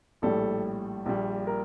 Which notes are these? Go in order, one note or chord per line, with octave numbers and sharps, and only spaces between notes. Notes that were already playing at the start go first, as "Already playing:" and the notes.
A#1 A2 G3 A4
A#1 A#2 G3
A#4